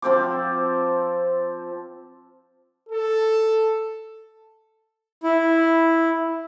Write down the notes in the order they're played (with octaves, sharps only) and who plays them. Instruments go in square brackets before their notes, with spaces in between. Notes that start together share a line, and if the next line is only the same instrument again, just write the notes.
[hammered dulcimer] F3 C4 C5 D6
[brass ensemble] A4
[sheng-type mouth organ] E4